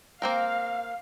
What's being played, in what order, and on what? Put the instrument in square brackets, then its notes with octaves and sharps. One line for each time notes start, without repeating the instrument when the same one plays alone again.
[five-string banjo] A#3 C4 A#4 [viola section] F5